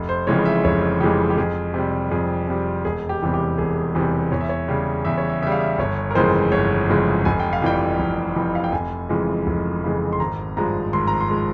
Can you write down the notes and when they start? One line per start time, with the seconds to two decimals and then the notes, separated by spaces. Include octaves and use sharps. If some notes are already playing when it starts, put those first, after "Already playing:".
Already playing: F1
0.09 C5
0.27 F2 C#3 E3 G#3 C#5
0.45 E5
0.65 F1 C#5
1.00 F2 C#3 E3 G#3 G4
1.30 G4
1.37 F2 G#4
1.74 C3 G3
2.11 F2 G#4
2.48 C3 G3
2.85 E1 G#4
3.09 G4
3.22 E2 C3 E3 G3
3.34 G4
3.58 E1 G#4
3.95 E2 C3 E3 G3
4.32 E2 C#5
4.41 E5
4.49 C#5
4.68 C#3 G3
5.05 E2 E5
5.18 C#5
5.29 E5
5.42 C#3 E5
5.47 G3
5.52 F5
5.60 E5
5.78 G1 C#5
6.11 A#4
6.15 F2 C#3 E3 G#3 C5
6.52 G1 C#5
6.89 F2 C#3 E3 G#3
7.25 F1 G#5
7.40 G5
7.53 F5
7.62 F2 E3 G3 G5
7.99 F1
8.36 F2 E3 G3
8.55 F5
8.64 G5
8.72 F1 G#5
9.09 F2 C#3 E3 G#3
9.47 F1
9.84 F2 C#3 E3 G#3
10.13 C6
10.20 G#1 A#5
10.57 G2 F3 G#3 A#5
10.93 G#1 C6
11.07 A#5
11.21 C6
11.30 F3 G#3